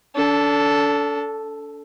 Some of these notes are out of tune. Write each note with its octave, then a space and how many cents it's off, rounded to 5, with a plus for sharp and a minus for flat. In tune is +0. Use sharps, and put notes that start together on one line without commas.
D4 -35 A4 +0